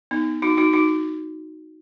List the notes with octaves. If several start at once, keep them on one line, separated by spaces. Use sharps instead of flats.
B3 D#4
D#4 F#4
D#4 F#4
D#4 F#4